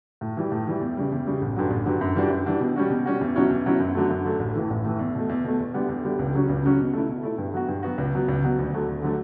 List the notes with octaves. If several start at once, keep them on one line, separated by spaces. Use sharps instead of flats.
A2
E3 G3
A2
E3 G3
E2
C#3 G3
E2
C#3 G3
A1
G2 D3 F#3
A1
G2 D3 F#3
F#2
E3 G3 D4 F#4
F#2
E3 G3 D4 F#4
B2
G3 C#4 F#4
B2
G3 C#4 F#4
E2
B2 F#3 C#4 E4
E2
B2 F#3 C#4 E4
F#2
D3 F#3 A3
F#2
D3 F#3 A3
A1
A2 E3
A1
A2 E3
E2
B2 A3
E2
B2 A3
E2
D3 G3 B3
E2
D3 G3 B3
C#2
C#3 F#3 C#4
C#2
C#3 F#3 C#4
B2
A3 E4
B2
A3 E4
G2
F#3 B3 F#4
G2
F#3 B3 F#4
C#2
B2 F#3 B3
C#2
B2 F#3 B3
D2
D3 F#3 A3
D2
D3 F#3 A3